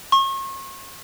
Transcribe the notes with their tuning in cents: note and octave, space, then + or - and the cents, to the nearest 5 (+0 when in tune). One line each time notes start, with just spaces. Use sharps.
C#6 -40